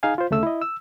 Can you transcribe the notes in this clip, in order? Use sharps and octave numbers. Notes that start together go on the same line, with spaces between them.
D#4 G#4 F5 G#5
F4 C5
D2 C#3 A3 E6
E4 D#5
E6